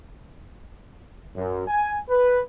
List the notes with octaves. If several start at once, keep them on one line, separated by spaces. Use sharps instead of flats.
F#2
G#5
B4